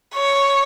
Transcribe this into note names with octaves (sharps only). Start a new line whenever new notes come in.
C#5